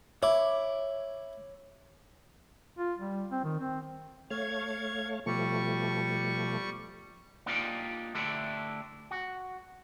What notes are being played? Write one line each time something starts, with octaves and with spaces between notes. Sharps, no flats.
E4 C#5 D6
F4
G3
C4
D#3
C4
A3 C#5 F5 G#6
B2 F3 G3 A3 C#6
A#3 D4 D#4 F4 G4 D5
D3 A3 D4 E4 G4
F#4